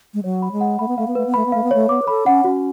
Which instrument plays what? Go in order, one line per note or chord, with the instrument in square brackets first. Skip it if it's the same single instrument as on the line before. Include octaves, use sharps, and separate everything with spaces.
[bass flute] G#3
[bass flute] F#3 [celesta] C#5
[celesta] B5
[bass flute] G#3
[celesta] F#5
[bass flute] A3 [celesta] B5
[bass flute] B3
[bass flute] A3 [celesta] F5
[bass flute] B3
[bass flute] A3 [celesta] B4
[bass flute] B3
[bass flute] A3 [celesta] B5
[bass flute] B3
[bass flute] A3 [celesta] F5
[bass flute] B3
[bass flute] A3 [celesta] C#5
[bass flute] B3 [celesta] D6
[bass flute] B4
[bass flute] A4 [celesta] B5
[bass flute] C#4 [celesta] F#5
[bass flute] C#4 [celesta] F#4